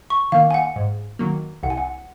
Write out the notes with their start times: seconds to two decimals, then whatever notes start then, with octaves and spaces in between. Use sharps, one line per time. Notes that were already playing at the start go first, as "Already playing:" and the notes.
0.10 C#6
0.32 D#3 A#3 F5
0.51 G#5
0.54 F#5
0.76 G#2
1.19 D#3 F#3 A#3
1.63 C2 F#5
1.70 G#5
1.77 F#5